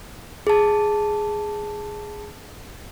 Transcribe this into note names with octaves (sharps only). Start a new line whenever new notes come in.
G#4 A5